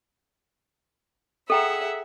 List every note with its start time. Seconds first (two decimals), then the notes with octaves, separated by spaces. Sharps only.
1.50 G#4 A4 E5 F#5 G5 A#5